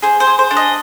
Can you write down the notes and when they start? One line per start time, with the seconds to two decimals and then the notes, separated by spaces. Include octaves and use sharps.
0.03 G#4 C5
0.20 C5
0.27 G#4
0.39 C5
0.51 D4
0.57 D#5